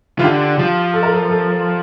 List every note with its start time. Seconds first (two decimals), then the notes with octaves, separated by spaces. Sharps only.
0.19 E3 F4
0.23 D3 G4
0.59 F3
0.93 A4
1.03 A#4
1.12 A4
1.29 A4